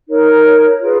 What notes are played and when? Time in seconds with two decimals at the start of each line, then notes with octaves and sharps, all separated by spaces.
0.08 D#4 A#4 C#5
0.79 F4 G#4 B4